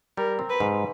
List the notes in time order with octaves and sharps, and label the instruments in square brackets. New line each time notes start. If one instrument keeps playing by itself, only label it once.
[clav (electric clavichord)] G3 [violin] A#4
[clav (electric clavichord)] C4
[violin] B4
[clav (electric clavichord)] G#2